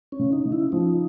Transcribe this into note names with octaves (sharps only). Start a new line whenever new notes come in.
C#4
C#3
D#4
C#3
E4
F3 D#4